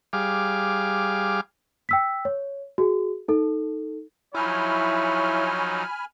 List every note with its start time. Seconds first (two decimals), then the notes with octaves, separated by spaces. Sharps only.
0.13 G3 G#4 F5 D6
1.89 G5 E6 B6
2.25 C#5
2.78 F#4 G#4
3.28 D#4 A4
4.34 F3 F#3 D#4 E4 C#5 G#5 B5 F6